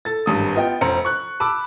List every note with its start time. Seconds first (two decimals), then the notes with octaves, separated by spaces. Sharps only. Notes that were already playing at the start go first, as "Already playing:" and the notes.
0.05 A4 A6
0.26 G#1 G2 D#6
0.55 B3 F4 D#5 G5
0.81 F1 C5 A#5 C#7
1.05 C#6 F#6
1.40 A5 B5 D6 E6